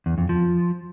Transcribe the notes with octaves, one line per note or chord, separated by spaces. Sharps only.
E2
F2
F3